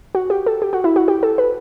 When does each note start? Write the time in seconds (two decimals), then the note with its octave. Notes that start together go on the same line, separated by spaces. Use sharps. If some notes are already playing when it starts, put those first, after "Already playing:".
0.15 F#4
0.30 G4
0.46 A4
0.62 G4
0.73 F#4
0.84 E4
0.96 F#4
1.08 G4
1.23 A4
1.38 B4